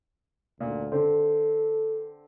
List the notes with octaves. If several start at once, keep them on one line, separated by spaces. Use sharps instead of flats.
D2 A#2
D3 C4 A4